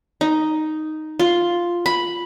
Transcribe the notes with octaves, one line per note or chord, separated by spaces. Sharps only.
D#4
F4
B5